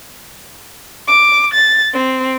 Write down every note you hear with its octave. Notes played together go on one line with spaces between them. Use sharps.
D6
A6
C4